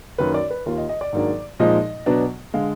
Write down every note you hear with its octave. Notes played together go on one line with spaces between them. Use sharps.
F#2 D#3 A#3 B4
D5
B4
D#2 D#3 A#3 F4 A#4
D#5
D#5
D5
G#2 D#3 F#3 A#3 D4
A#2 F3 G#3 D#4 D#5
B2 F#3 B3 D4
D3 G#3 F5